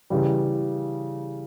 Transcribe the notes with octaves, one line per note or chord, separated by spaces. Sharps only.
C#3 E3 G3